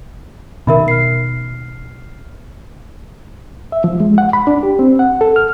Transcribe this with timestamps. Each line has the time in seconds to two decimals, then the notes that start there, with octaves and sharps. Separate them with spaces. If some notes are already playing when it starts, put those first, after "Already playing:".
0.67 B2 D#3 A#4 E5 B5
0.88 F6 C7
3.72 E5
3.84 F3
4.00 G#3
4.18 F#5
4.33 B5
4.47 D4
4.63 G4
4.79 C4
4.99 F#5
5.21 A4
5.36 F6